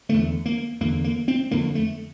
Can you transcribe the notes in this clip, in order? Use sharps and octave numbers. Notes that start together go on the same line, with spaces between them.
E2 D3 A3
A#3
E2 D3 A#3
A#3
C4
F2 D3 A#3
A3